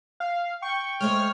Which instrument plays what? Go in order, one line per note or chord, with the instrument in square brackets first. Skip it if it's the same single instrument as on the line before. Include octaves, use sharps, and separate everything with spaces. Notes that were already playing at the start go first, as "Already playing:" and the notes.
[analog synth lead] F5
[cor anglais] G5 [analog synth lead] C#6
[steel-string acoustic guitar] G#3 A3 C5 [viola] C#5 [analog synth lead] F6